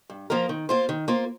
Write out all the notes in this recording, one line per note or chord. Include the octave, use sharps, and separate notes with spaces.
G2
F3 A#3 F4 A#4
D#3
A#3 F4 C5
D#3
A#3 F4 C5